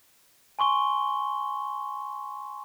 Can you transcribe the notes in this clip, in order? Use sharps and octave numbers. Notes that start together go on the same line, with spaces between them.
G#5 C6 C#6 G7